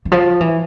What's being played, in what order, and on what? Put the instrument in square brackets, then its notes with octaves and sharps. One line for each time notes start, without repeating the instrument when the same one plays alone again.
[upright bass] E3
F3
E3